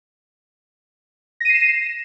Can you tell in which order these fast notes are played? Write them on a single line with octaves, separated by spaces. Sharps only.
A#6 D#7 C7 E7